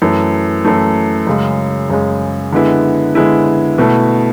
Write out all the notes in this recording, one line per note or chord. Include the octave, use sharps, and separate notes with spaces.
F#2 E3 A3
F#2 E3 A3
F#2 C#3 G#3
F#2 C#3 G#3
D3 G#3 B3 E4
D3 G#3 B3 E4
B2 A3 E4